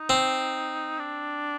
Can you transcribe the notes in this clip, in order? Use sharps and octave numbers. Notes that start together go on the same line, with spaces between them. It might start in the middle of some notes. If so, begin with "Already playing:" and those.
Already playing: D#4
C4
D4